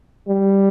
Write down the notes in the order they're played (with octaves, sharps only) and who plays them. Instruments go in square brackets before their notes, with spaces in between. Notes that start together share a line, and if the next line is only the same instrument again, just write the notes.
[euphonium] G3